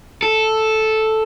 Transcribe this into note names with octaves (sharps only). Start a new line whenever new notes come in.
A4